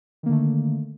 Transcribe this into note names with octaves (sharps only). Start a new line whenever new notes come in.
D3 D#3 A3 A#3